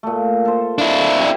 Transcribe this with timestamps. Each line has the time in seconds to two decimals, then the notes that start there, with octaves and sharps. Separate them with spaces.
0.03 A#2 A3
0.45 A4 C5
0.78 D4 E4 F5
1.19 G3